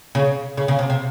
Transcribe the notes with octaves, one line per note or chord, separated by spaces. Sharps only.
C#3
C#3
C#3
C3
C3